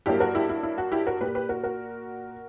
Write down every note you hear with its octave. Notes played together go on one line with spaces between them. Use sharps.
G2 F#3 A#3 E4 G4
F#4 A#4
E4 G4
E4
E4
F#4
E4 G4
F#4 A#4
A#2 A#3 G4 B4
G4 B4
F#4 A#4
F#4 A#4